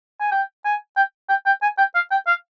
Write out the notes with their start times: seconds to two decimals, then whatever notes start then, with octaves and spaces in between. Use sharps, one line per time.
0.20 G#5
0.32 G5
0.65 G#5
0.97 G5
1.29 G5
1.46 G5
1.62 G#5
1.78 G5
1.95 F5
2.11 G5
2.27 F5